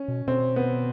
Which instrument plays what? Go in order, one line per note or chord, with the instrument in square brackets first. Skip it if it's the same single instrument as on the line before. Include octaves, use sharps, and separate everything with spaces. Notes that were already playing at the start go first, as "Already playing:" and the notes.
Already playing: [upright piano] C#4
[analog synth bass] B2
[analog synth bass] B2 [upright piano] C4
[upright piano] B3